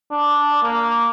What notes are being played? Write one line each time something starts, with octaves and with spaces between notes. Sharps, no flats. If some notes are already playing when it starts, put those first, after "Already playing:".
D4
A#3